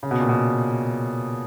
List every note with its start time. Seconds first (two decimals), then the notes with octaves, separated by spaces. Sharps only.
0.03 C#3
0.11 B2
0.20 A#2
0.29 B2